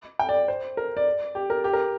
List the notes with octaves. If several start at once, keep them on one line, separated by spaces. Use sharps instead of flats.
G5
D5
C5
A#4
D5
G4
A#4
G4
A#4